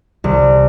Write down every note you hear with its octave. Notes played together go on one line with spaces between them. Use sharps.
C2